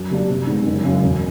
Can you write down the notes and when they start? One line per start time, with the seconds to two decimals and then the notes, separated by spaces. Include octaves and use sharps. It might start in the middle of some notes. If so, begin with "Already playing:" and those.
Already playing: F#2
0.11 D3 G3 A#3 D4
0.30 C3
0.47 D#3 G#3 B3
0.66 F#1
0.84 F#2 C#3
1.03 E1